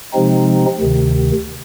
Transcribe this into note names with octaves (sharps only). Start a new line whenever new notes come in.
C3 F3 G#3 C4 D#4
D2 C3 D#3